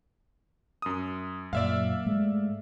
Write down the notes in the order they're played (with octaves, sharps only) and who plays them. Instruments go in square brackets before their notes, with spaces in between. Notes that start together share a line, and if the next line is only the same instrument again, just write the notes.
[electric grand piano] F#2 D#6
[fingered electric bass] F#2 A#2 A#3 [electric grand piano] D5 E5 F5
[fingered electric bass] G#2 G#3 A3